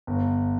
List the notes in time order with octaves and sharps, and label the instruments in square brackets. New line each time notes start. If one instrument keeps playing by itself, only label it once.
[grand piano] G1